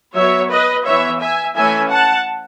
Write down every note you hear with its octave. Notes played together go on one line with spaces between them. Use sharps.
F#3 B3 C#5 E5
B4 D#5
E3 B3 C#5 E5
E5 G#5
E3 A3 C#4 E5 G#5
F#5 A5